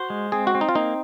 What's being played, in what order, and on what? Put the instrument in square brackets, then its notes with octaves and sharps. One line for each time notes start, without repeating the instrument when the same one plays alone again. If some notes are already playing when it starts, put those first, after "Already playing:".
Already playing: [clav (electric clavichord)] F#4 [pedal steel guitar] C5
[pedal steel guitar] G#3
[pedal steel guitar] C4 [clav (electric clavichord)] G#4
[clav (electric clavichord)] F#4
[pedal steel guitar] C4
[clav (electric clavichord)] D#4
F4
[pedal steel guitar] A#3 [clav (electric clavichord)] D#4